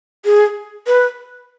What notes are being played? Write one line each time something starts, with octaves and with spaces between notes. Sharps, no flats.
G#4
B4